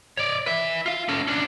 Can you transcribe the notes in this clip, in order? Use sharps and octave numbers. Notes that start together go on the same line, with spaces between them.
C#5 D5
B4 E5
F4 F5
C#4 A4
C#4 D4